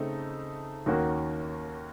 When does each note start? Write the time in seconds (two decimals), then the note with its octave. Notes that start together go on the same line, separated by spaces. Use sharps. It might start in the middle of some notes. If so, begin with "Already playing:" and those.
Already playing: C#3 A3 C4 D#4 A4
0.86 D#2 D#3 A#3 C#4 F#4